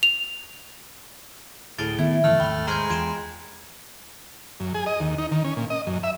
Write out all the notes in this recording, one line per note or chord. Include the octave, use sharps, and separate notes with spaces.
F7
D1 A2 G#4 F6 A6 D7 G7
D#3 B3 E4 G#6
F#2 C#3 E3 A3 F6
G#1 D#2 G5 B5 F6
G#3 C5 G5 A#5 C6 F6 G#6
E2 F4 G5 G#6 D7 E7
F#2
G#4
D#5
D#2
D#4
D#3
C#4
A#2
D#5
F#2
E5